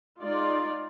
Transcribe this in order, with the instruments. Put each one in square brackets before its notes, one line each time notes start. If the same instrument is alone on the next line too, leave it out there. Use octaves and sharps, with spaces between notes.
[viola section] G#3 D#4 F4 D5